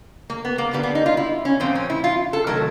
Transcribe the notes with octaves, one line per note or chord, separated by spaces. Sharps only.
A#3
B3
A#3
D3 G3 A#3 B3
B3
D#4
F4
E4
C#4
A#2 F3 A#3 C4
C#4
E4
F4
A4
C3 D#3 F#3 A3 A#4